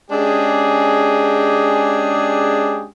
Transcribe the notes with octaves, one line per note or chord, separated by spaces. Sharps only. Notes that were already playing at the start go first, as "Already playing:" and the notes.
G#3 C#4 D4 G4 G#4